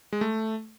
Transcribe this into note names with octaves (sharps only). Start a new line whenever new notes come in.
G#3
A3